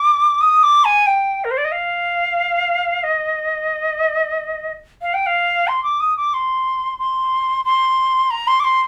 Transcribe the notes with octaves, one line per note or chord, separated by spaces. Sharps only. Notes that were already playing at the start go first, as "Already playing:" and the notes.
Already playing: D6
D#6
D6
G#5
G5
A#4
C5
D5
D#5
F5
D#5
F5
G5
F5
C6
D6
D#6
D6
C6
C6
C6
A#5
C6
D6
C6